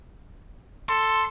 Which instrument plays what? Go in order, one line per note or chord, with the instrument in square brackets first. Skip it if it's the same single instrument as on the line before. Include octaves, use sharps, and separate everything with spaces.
[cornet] A4 [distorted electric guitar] C6